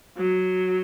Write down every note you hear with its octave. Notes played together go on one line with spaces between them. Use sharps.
F#3